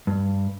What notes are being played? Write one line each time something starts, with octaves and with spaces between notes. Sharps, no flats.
G2